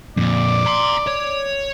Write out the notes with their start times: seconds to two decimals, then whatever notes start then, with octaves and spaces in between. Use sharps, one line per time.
0.17 F2 A#2 D5
0.66 A#5 C6
1.07 C#5